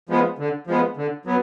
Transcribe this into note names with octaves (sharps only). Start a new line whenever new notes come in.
F3 G#3 B3
D3
F3 G#3 B3
D3
F#3 B3